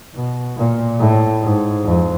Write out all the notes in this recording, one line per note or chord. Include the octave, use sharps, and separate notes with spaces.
B2
A#2
A2
G#2
F2